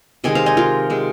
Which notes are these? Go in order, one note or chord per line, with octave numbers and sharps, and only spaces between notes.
C3 D#3 G#3 D#5 G#5
C5 F5
D#5 G#5
F4 A#4
C3 G#3